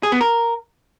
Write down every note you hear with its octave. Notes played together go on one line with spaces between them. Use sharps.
G#4
B3
A#4